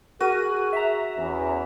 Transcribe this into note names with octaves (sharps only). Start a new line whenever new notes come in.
F#4 G#4 A#4 D#7
E5 A#5
E2 C#4